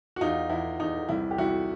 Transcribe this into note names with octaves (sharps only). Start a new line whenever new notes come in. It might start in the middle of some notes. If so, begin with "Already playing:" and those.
F#4
E2 D#4 F4
E2 E4
E2 D#4
C2 E4
G4
C2 E4 F#4